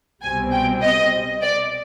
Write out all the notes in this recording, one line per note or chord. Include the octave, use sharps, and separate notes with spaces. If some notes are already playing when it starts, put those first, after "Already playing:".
C2 B2 G3 C4 G#5
G5
D#5
D5